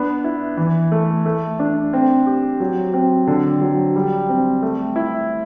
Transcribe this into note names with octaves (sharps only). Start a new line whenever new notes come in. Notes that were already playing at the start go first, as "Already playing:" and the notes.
Already playing: B3 D4
E4
E3
A3
A3
D4
C4
G4
F#3
C4
D3
F#3
G3
C4
A3
E4